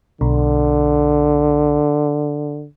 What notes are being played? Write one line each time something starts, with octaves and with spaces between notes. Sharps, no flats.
B1 D3